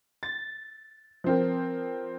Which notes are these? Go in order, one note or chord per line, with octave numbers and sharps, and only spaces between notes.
A6
F3 C4 A#4